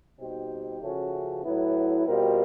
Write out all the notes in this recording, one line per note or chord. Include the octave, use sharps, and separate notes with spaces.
B2 G3 C4 D#4 G4
C#3 F3 A3 C#4 F#4
A2 F#3 B3 E4
B2 G3 C4 F4 A#4